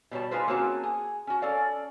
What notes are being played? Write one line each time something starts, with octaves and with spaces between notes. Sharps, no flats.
B2 G3 C#5 A5
D#4 F4 G#4 B4 C5
A#3 C4 C#4 F#4 G#4 A5
G#4
C#4 F#4
C#4 A4 D5 F5